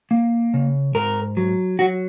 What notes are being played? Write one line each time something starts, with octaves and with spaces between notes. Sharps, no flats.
A#3
C#3
G#2 A#4
F#3
F#3 F#4